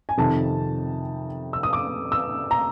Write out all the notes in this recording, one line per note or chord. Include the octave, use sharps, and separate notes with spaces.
G#5
F2 C3 D#3 A5
E6
D#6
D6
E6
A#5